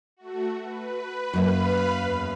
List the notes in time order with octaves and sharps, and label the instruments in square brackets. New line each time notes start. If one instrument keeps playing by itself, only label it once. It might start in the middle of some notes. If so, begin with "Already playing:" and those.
[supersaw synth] A3 F#4
B4
[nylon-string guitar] F#2 A#3 [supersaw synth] B4 F5 B5
[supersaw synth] E2